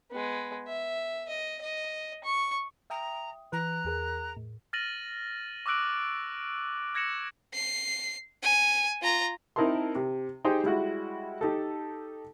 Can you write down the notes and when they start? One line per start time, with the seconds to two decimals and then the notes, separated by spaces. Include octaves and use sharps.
0.11 G#3 B3
0.68 E5
1.28 D#5
1.61 D#5
2.24 C#6
2.90 E5 G5 A#5 D#6
3.52 E3 B4 A#5 F#6
3.85 E2 G#4 A#4
4.37 A2
4.73 F6 A6 A#6 D#7 F#7
5.66 C#6 D6 E6 F#6 D7 F#7
6.95 F#6 G#6 A#6 C#7 E7 F#7
7.53 C7
8.43 G#5
9.02 F4 A#5
9.56 C4 D#4 E4 A#4 A5 C6
9.95 C3
10.45 D#4 G4 G#4 C5 G5 G#5
10.64 G3 G#3 E4 F#4
11.41 D#4 G4 A4